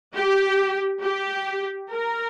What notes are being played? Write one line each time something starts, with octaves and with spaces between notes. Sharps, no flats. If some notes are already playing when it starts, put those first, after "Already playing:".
G4
G4
A#4